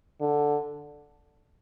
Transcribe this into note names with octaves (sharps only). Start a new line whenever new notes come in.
D3